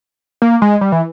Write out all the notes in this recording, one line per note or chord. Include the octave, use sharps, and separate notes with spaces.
A#3
G#3
G3
E3